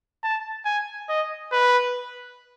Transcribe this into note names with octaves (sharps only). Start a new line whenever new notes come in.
A5
G#5
D#5
B4